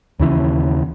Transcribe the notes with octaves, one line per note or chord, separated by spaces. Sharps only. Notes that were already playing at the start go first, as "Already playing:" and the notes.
D#2 C#3 E3